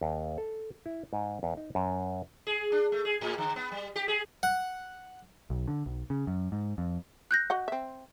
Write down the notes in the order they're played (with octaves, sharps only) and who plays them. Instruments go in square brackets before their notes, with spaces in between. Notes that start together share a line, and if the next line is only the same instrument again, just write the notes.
[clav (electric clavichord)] D#2
A4
E4
G#2
E2
D#4
F#2
[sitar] G#4
D4
A3
G#4
A2
D3
B3
G3
G4
G#4
[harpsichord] F#5
[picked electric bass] B1
D3
B1
C#3
F#2
G#2
F2
[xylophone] F#6 G6 A#6
[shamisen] F#4 D#5 F#5
C4 E5